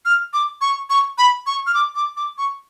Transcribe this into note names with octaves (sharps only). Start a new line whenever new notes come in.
F6
D6
C#6
C#6
B5
C#6
F6
D6
D6
D6
C#6